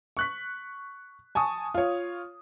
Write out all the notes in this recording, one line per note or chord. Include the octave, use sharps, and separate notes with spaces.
C#6 F#6 B6
G#5 A5 C#6 D#6
F4 C#5